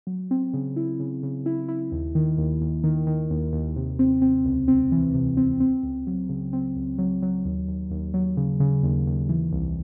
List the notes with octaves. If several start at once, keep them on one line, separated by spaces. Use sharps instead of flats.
F#3
C4
C#3
E4
C#3
C#3
E4
E4
D#2
D#3
D#2
D#2
D#3
D#3
D#2
D#2
C3
C4
C4
C#2
C4
E3
C3
C4
C4
C#2
F#3
C#3
C4
C#2
F#3
F#3
D#2
D#2
D#2
F#3
C#3
C#3
D#2
D#2
E3
C2